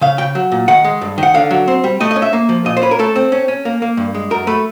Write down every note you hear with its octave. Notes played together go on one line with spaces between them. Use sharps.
C#3 F5
C#3 G5
F#3
A#2
D#3 F#5
G#3
G2
D#3 F#5
D3 F5
F#3
C4
G3
A3 D#5
D#5
C#4
E5
A#3
F3
A#2 D#5
C5
C#4 B4
A#4
A3 A4
C4
C#4
C#4
A#3
A#3
G2
G#3
F#2 A#4
A3 B4